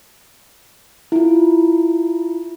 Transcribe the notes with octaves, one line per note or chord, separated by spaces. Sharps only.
E4 F4